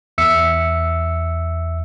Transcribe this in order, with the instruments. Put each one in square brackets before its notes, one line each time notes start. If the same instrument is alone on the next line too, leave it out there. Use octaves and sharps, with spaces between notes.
[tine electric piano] E2 E5 E6 C#7